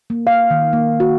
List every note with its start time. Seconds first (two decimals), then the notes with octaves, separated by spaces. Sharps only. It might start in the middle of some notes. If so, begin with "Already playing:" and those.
0.10 A#3
0.27 F5
0.51 D#3
0.73 A#3
1.00 F#4